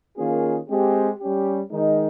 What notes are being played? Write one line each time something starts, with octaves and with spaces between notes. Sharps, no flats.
D#3 A#3 C#4 F4 G#4
G#3 C4 G4
G3 C#4 G4
D#3 G#3 D#4